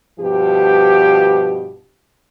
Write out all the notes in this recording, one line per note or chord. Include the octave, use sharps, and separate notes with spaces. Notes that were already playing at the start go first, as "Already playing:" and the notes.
G2 B2 F3 G4